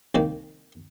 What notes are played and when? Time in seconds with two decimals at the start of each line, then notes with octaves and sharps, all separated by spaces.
0.15 C2 D#3 A#3